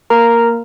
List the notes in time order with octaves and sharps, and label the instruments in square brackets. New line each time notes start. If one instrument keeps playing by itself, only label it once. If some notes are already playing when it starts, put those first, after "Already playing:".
[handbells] A#3 A#4 A#5